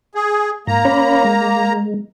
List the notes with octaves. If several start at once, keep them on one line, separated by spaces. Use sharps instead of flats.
G#4
G#2 A#3 A#5
C#4 C#5 B5
G#3